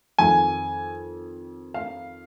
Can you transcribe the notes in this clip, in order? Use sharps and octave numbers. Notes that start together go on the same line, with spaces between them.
F2 D#3 G#5
F5